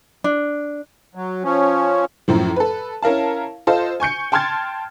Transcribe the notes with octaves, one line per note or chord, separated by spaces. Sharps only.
D4
F#3
F3 C#4
F#2 A2 F3
A4 B4
C#4 E4 A#4 F5 A5
F4 A4 C5 D#5 F5
G#5 C#6 G6 C#7
G5 A5 C6 F6 G#6 A6